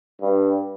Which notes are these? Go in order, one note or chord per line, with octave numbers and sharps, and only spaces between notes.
G2